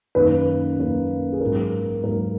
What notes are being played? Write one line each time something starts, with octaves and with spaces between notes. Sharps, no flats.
F#2 D#3 A#3 B4
F#2 D#3 A#3
G#4
G#2 F#3 A#3 A#4
G#2 F#3 A#3 A#4